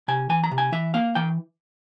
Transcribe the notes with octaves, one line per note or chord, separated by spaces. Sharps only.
C3 G#5
E3 G#5
A#5
C3
G#5
E3 E5
A#3 F5
E3 G5